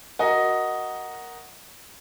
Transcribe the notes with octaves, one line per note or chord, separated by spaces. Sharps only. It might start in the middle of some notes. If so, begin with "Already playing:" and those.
F#4 A#4 D#5